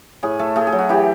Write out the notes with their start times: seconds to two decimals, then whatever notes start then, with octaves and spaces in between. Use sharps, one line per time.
0.23 A2 G#4
0.39 A3 A4
0.56 A3 G#4
0.67 G#4
0.72 F#3
0.79 F#4
0.89 E3 G4